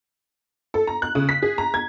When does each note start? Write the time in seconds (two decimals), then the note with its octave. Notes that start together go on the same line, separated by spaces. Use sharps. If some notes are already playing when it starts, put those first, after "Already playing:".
0.74 A4
0.87 A#5
1.02 F#6
1.15 C#3
1.29 B6
1.43 G#4
1.58 A#5
1.74 G#6